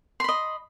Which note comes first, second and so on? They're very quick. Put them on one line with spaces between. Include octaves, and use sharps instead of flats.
C6 B5 D#5